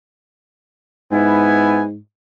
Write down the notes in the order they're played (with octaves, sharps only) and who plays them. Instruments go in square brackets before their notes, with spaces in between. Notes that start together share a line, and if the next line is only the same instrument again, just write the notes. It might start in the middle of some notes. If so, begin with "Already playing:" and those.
[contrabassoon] G#2 [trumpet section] B3 E4 G#5